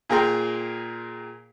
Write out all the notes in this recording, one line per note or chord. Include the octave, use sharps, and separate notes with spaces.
A#2 G#4 A#4 G5 A#5 C6